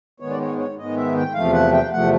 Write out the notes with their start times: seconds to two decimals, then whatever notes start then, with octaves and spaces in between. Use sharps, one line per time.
0.20 G#2 D#3 G#3 B3 C#5
0.31 D5
0.40 C#5
0.58 C#5
0.77 G#2 D#3 G#3 B3 D#5
0.96 E5
1.16 G5
1.34 E2 C3 F3 A3 F5
1.53 F#5
1.72 G5
1.91 E2 C3 F3 A3 F#5